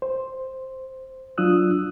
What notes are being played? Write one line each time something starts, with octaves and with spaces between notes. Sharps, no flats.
C5
F#3 D4 F4 D#6 E6 F#6